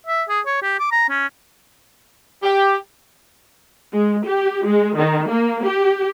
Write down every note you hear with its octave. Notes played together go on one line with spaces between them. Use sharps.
E5
G#4
C#5
G4
D6
A#5
C#4
G4
G#3
G4
G#3
D#3
A#3
G4